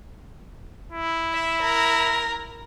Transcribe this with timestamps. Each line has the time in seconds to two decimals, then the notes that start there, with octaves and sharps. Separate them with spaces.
0.92 E4
1.33 E5
1.61 A#4